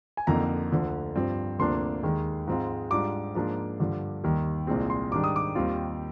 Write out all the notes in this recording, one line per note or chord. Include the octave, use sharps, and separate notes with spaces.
G#5
F2 D3 F3 A#3 D#4 A#5
D2 D3 F3
G2 F3 C4
D2 C3 F3 A#3 D4 C6
D#2 D#3 G#3
G#2 F3 G#3 C4 F4
G#2 G3 D4 F4 D6
G#2 F3 A#3 D4 F4
G2 D3 F3
D#2 D#3 G3
C2 A#2 G#3 C4
C6
G#2 D#3 G3 D4 D6
D#6
D6
D#2 D#3 G3 C4 F4